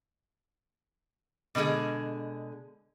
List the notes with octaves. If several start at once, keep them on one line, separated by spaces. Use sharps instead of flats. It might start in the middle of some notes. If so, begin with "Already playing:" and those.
B2 D3 E3 G#3 G#4